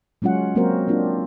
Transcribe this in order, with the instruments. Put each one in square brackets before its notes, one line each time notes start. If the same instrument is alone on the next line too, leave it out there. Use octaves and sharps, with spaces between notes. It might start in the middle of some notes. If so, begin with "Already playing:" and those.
[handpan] F#3 G#3 C#4 F4 F#5
F#3 A#3 C4 F#4 A#4 C5
A#3 C4 D4 F4